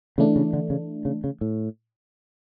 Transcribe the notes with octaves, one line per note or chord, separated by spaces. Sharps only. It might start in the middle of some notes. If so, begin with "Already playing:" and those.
C#3 E3 A3 D4
C#3
D3
C#3
C#3
C#3
A2